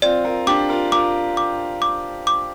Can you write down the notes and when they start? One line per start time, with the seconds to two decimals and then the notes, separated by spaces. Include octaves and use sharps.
0.02 C4 F4 D5
0.24 F4 A#4
0.47 D4 G4 D6
0.69 F4 A#4
0.92 F4 A#4 D6
1.37 D6
1.82 D6
2.27 D6